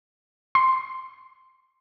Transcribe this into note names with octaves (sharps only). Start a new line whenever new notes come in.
C6